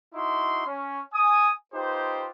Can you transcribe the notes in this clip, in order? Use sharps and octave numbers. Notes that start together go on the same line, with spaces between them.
D#4 E4 F#4 C6
C#4
G#5 D#6
D#4 F4 G4 B4 C5